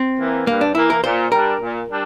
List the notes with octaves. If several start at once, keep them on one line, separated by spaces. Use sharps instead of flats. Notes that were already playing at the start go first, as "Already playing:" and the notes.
Already playing: C4
E3 A#3
G2 A#3
D4
E3 A#3 E4
A#4
A#2 C5
G3 D4 A#4
A#2
G3 D4